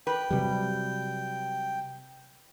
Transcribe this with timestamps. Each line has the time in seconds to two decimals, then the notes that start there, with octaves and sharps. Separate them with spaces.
0.07 B4 G5
0.31 C3 F#3 G3